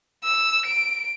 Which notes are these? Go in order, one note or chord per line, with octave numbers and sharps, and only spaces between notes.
E6
D7